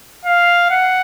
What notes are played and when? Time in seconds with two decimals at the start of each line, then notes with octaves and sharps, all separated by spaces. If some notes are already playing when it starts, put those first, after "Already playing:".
0.25 F5
0.71 F#5